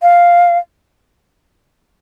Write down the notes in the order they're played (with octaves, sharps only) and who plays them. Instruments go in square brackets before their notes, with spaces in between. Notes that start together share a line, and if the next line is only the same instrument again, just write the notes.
[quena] F5